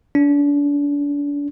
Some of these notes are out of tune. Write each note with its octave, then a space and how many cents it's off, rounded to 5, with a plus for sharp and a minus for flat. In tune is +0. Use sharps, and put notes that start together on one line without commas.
D4 -35